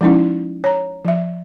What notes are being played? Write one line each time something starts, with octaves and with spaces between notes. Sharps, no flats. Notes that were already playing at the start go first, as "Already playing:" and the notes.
F3 G#3 C#4 D#4 E4
C#5 A#5
F3 E5